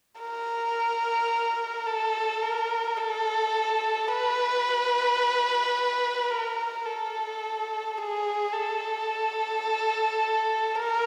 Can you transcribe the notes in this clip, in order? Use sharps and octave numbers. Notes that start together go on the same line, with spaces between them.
A#4
A4
A#4
A4
B4
A#4
A4
G#4
A4
A#4